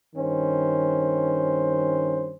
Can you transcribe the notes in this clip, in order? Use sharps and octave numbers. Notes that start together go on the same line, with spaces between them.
G2 D#3 C#4 C5